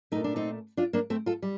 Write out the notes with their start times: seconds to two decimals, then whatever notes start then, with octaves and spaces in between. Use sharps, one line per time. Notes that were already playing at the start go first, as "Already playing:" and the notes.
0.12 A#2 A3 D#4
0.24 D4
0.36 C4 D#4
0.77 D4 F4
0.93 A#3 D4
1.10 A3 C4
1.26 F4 A4
1.42 G3